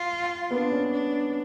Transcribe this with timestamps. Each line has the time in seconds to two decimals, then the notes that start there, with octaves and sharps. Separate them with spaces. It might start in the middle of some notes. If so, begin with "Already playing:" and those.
Already playing: F4
0.51 B3 D4
0.72 C#4
0.93 D4